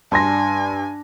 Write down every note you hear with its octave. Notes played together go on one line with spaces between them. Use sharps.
G2 D4 G#5 A5 C6 A#6